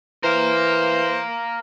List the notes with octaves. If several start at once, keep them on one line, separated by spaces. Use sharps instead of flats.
E3 A#4 C5 F5